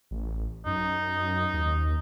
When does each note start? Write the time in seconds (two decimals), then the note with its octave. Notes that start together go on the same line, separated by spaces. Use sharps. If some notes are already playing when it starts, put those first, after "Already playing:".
0.11 A1
0.66 F#2 D#4
1.53 D#2